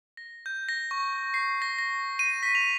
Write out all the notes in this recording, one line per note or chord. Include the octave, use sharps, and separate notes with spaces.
A#6
G6
A#6
C#6
C7
A#6
A#6
D#7
B6
F7